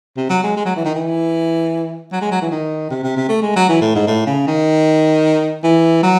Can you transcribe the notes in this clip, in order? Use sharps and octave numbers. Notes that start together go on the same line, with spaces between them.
C3
F#3
G#3
G#3
F#3
E3
D#3
E3
F#3
G#3
F#3
E3
D#3
C3
C3
C3
A3
G#3
F#3
E3
A2
G#2
A2
C#3
D#3
E3
F#3